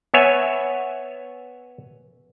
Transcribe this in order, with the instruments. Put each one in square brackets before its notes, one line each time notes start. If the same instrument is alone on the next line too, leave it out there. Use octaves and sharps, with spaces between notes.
[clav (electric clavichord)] B3 C#5 E5 G#5